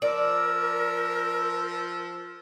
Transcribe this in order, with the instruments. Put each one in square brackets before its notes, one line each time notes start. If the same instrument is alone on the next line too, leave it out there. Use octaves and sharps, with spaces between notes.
[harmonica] F3 E6 [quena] A#4 [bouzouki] D5